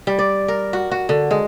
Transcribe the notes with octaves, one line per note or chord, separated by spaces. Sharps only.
G3
D5
A#4
F#4
F#4
D3
G#3